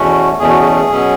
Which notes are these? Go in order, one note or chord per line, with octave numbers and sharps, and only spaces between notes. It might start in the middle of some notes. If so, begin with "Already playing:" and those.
Already playing: E2 B2 A3 C#4 F#4
E2 B2 A3 C#4 G#4
F#4
G#4
B2 F#3 C#4